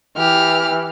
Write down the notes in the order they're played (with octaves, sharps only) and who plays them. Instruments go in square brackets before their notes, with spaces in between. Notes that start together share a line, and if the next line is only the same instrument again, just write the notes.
[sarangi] E3 [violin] G4 F6